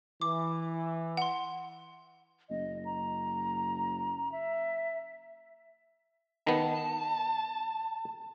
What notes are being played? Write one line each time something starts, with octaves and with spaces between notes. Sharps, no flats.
E3 D6
F#5 C6
F#1 D#5
A#5
E5
D#3 B3 A5